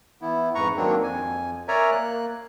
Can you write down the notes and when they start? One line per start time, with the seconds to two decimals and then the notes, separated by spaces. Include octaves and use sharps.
0.21 E3 B3 E4
0.55 F2 G#2 B4 A#5 C#6
0.77 D#3 F#3 A#3 C4 D4
1.03 F2 G#5
1.68 A#4 C#5 D5 E5 G#5 A#5
1.91 A#3 F#6